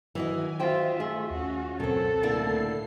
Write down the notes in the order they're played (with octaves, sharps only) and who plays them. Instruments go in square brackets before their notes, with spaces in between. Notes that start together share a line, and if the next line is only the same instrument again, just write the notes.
[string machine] D#3 G#5 [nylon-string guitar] E3 F#4 D#5 [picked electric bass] F#3
[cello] F4 E5 [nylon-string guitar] F#4 C5 G5 [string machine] D#5
[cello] A3 [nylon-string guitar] G#4 E5
[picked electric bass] D#2 [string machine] C#4 F4 [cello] F#4
[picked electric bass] C#2 B2 F#3 [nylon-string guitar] F#2 C4 [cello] A4 [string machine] F#5
[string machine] A2 C7 [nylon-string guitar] D3 A#3 E4